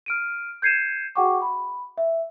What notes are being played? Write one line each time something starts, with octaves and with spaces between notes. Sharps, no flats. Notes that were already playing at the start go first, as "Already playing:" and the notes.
F6 D7 D#7
G6 G#6 C7 C#7 D#7 E7
F#4 G#4 F#5 G5 C#6 D6
B5
E5